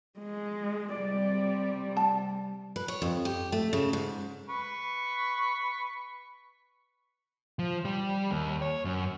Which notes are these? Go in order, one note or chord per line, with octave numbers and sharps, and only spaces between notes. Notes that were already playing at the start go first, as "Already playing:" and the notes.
G#3
C3 G3 D5
A5
B4
C#5
F2
G4
A3
C#3
G#2
B4 C#6
F3
G3
D#2
C#5
F#2